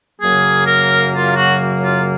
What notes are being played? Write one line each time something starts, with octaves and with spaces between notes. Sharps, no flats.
F#2 C#3 F#3 A#3 G#4
A#4
F4
F#4
F4